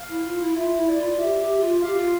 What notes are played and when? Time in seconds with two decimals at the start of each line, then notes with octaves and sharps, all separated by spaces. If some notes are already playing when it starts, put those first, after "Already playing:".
Already playing: F5
0.09 E4
0.24 F4
0.40 E4
0.55 F4 E5
0.76 E4
0.87 D5
0.98 F4
1.11 F4
1.18 G4 E5
1.40 G4
1.60 F4
1.82 G4 F5
1.97 F4